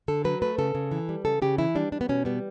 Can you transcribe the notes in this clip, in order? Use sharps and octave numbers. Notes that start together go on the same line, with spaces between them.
D3 A4
F#3 B4
A3 B4
C#3 A4
C#3
E3
G3
C#3 A4
C#3 G4
E3 E4
G3 D4
G3 D4
B3
B2 C#4
G3 B3